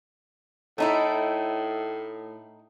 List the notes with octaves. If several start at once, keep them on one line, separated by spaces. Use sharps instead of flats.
A2 A3 D#4 E4